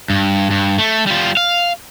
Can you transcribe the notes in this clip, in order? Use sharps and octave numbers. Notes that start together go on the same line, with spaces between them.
G2
G2
A3
G3 F4
F5